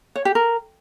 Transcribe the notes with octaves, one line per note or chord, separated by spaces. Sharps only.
C#5
G4
A#4